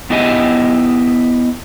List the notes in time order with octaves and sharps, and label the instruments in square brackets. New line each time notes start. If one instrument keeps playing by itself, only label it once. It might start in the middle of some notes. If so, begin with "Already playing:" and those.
[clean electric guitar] B3 E4 G4 D#5 E5 G#5